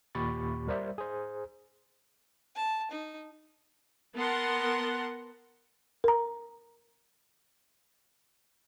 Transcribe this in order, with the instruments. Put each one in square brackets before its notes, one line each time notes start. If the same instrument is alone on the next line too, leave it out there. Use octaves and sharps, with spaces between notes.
[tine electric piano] D#2 A#2 G4 B5 C#6 A6
G3 A#4 C5 D5 E5
G#4 C5
[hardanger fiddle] A5
D#4
[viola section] B3 A#4 F#5 A5 C6
[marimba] A#4 A#5